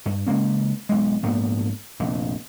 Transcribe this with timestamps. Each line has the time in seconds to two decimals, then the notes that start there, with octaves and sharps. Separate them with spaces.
0.06 G2
0.27 C#3 G#3 A#3 C#4
0.89 B1 G#3
1.23 A#1 G#2 A#3 B3
2.00 F1 A#1 A#2